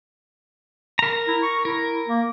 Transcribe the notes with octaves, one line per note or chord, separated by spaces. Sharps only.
A#4 A#5
E4
C#6
E4 A#4
A#3